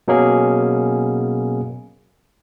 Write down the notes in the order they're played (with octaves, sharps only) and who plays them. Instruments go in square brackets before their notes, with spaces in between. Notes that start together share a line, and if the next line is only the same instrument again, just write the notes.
[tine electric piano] B2 F#3 A#3 C#4 G#4